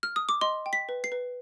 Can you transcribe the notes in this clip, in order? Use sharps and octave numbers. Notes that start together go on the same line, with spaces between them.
F6
D#6
D6
D#5 C6
G5
B6
B4
C7
B4